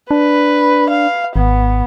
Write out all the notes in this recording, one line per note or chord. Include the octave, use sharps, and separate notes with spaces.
D4 B4
F5
G#1 B3